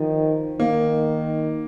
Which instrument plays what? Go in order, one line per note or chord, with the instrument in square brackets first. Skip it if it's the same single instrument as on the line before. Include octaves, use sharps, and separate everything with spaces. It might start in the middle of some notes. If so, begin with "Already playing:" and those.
Already playing: [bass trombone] D#3 [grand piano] F3
[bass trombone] D#3 [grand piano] A#3